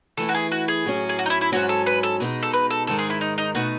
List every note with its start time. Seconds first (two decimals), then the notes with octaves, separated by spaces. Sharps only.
0.17 E3 A3 E4 A4
0.29 F#4
0.35 G#4
0.52 F#4
0.68 G#4
0.85 A2 F#3 C#4
1.09 G#4
1.19 F#4
1.26 D#4
1.30 E4
1.41 E4
1.52 G#2 F#3 C#4 F#4
1.69 A4
1.86 B4
2.03 A4
2.20 B2 G#3 D#4
2.43 A4
2.53 B4
2.70 A4
2.87 G#2 D#3 G#3 A4
2.99 G#4
3.10 E4
3.21 D#4
3.38 D#4
3.55 B2 A3 D#4 F#4